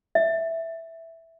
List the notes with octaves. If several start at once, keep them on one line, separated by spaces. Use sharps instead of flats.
E5